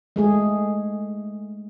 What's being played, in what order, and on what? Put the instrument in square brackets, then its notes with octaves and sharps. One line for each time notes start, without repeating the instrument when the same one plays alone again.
[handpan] G#3 A3 G#4